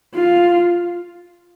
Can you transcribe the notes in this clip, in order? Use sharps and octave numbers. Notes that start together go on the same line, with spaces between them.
F4